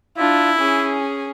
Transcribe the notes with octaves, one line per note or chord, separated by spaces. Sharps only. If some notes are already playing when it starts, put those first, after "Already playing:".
D4 E4 F4
C#4 G#4